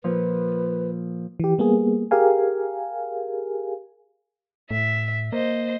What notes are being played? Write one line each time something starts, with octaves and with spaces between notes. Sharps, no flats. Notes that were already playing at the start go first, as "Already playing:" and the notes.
A#2 F3 B4
E3 G4
G3 A#3 B3 G#4
G4 G#4 A#4 F5 G#5
A2 E5
A#3 C5 D#5